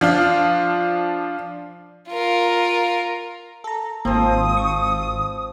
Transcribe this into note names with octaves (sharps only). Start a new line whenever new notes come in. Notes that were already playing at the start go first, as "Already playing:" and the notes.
F3 D4 F4
F4 A#4
A4 A#5
G#1 F3 A#3 C4 D#6
C#6